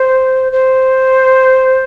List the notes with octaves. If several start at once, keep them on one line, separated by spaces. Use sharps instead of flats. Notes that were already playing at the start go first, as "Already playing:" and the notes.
Already playing: C5
C5